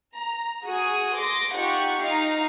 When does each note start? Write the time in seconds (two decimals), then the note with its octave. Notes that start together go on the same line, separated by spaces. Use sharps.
0.14 A#5
0.65 F#4 G#4 D#6
1.17 C6 D6 A#6
1.55 D#4 F4 G4 F#5 C#6
2.03 D#4 F5 A#5